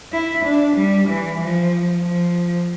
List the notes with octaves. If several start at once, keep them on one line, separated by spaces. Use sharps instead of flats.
E4
D4
G3
E3
F3
F3